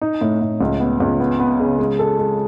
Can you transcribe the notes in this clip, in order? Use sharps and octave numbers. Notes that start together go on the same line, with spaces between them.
D#4
A2
A2
C#2
B3
C#2
B3
B3
C#3
G#3
A4
G#3